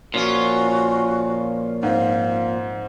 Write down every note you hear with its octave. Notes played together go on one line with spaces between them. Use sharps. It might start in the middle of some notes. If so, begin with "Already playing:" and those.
A#2 F3 C#4 F4 F#4
G#2 C4 F5